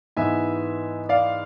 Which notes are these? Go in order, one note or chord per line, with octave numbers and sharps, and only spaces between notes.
G#2 E3 B3 E5 G#5
D5 F5